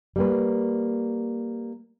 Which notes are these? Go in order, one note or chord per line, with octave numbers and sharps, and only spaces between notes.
G3 A#3 B4